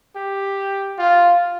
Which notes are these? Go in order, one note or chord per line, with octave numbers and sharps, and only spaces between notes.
G4
F4